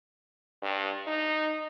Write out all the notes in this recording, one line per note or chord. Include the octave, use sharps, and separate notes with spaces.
G2
D#4